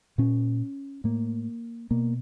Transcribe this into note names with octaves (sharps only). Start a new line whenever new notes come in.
A#2 C#4
A2 A#3
B2 A#3